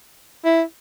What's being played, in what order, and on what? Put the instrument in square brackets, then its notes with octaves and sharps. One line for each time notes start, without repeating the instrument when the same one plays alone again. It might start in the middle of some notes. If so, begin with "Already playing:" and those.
[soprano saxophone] E4